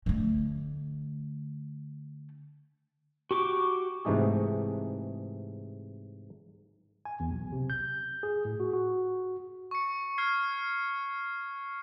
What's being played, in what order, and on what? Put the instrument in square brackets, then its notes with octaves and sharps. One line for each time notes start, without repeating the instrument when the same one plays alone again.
[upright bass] D3 A3
[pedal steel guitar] F#4 G4 C#6 D6
[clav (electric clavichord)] G#2 C3 E3 A3 D#4 G#4
[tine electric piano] G#5
E2
B1
C3
G6
G#4
A2
F#4
F#4
[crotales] C#6 C#7
F6 G#6 C7